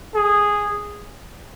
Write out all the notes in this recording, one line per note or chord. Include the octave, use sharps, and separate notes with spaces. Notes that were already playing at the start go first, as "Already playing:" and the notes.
G#4